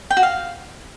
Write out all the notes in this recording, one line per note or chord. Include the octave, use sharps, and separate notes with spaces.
G5
F#4
F5